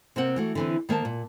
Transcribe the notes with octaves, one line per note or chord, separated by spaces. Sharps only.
C3 A#3 C4 F#5
E3 A3 F#4
D3 E3 C4
D#3 A#3 C5 A5
A#2